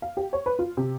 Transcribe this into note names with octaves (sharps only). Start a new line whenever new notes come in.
F5
G4
C#5
B4
F4
C3